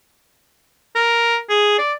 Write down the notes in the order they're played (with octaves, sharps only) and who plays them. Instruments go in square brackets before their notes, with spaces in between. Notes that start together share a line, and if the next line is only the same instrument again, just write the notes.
[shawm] A#4
G#4
D5